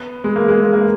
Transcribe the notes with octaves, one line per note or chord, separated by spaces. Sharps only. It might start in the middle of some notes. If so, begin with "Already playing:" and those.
Already playing: B3
G#3
A#3
G#3
A#3
A#3